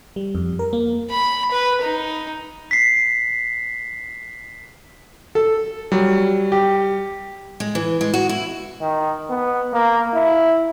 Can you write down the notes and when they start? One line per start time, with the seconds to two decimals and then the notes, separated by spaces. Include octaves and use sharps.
0.16 G3
0.35 F2
0.59 A#4
0.73 A#3
1.11 B5
1.51 B4
1.81 D#4
2.71 B6 C7
5.35 A4
5.92 F#3 G3
6.52 G4
7.60 G#3
7.75 E3
8.01 G#3
8.14 F#4
8.29 E4
8.81 D#3
9.30 B3
9.73 A#3
10.14 E4